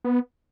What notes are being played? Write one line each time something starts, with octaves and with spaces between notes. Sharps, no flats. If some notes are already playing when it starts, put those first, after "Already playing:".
B3